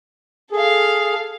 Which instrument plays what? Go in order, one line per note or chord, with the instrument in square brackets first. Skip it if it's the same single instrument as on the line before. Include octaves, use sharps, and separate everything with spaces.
[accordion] G#4 [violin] A4 F5